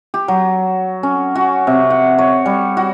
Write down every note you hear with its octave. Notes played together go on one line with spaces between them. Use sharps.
G4
F#3
C#4
F#4
C3
F#5
C#5
G3
F#4